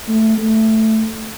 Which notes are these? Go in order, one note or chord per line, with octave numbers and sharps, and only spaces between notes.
A3
A3